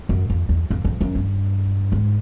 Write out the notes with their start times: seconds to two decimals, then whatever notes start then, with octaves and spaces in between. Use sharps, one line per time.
0.09 F#2
0.30 F2
0.49 E2
0.70 F2
0.85 F2
1.01 F#2
1.15 G2
1.92 G#2